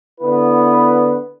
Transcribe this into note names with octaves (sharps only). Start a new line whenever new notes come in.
D3 B3 E4 B4